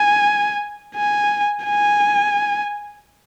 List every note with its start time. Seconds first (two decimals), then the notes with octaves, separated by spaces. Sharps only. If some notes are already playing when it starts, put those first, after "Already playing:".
Already playing: G#5
0.96 G#5
1.65 G#5